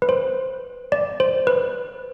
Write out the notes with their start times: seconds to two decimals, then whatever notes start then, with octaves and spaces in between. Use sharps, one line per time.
0.02 B4
0.09 C5
0.92 D5
1.20 C5
1.47 B4